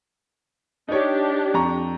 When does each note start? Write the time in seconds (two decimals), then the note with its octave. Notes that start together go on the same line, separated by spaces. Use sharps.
0.89 D4 D#4 G4 C#5
1.54 F2 A#5 C#6